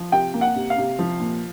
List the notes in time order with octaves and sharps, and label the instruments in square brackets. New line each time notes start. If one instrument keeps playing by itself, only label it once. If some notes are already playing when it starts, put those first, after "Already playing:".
Already playing: [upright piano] F3
C3 G5
A#3
F#5
C3
F5
C3
F3
A#2